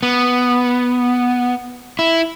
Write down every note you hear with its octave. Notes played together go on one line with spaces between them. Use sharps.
B3
E4